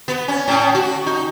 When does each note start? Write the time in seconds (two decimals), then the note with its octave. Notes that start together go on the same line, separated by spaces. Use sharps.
0.08 B3
0.28 C#4
0.48 A2
0.75 F#4
1.06 D#4